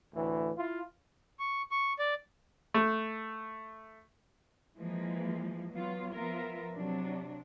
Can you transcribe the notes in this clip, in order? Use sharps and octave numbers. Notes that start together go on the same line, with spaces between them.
D2 A2 E3
E4 F4
C#6
C#6
D5
A3
E3 F3 G#3 A#3
F#3 B3 F4
F3 B3 F4 A#4 E5
C3 F#3 D4